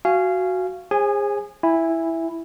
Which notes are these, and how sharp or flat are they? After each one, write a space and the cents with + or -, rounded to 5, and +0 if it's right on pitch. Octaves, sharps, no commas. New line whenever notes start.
F#4 +0 F5 -20 G#5 +0
G#4 -30 C5 +40 G#5 +0
E4 +0 G#5 -25